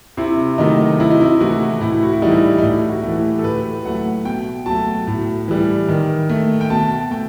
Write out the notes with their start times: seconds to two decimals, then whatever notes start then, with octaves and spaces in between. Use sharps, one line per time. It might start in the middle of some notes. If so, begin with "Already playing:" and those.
0.17 C3 E4
0.58 D#3 F#3 A3 D#4
1.00 C3 E4
1.10 D#4
1.21 E4
1.40 E3 A3 F#4
1.81 A2 E4
2.03 F#4
2.13 E4
2.22 E3 G3 D#4
2.58 D#4
2.63 A2 E4
2.89 F#4
3.03 E3 A3
3.17 G4
3.38 A4
3.44 A2 B4
3.85 F#3 A3 F#5
4.25 B2 G5
4.66 F#3 A3 A5
5.07 A2
5.48 E3 G3
5.88 D#3
6.29 A3
6.61 G5
6.70 B2 A5
7.11 A3 G5